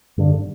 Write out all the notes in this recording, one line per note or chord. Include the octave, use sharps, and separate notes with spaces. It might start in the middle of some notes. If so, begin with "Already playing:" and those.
G2 D3